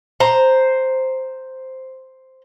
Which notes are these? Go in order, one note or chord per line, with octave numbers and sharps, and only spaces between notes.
C5 A#5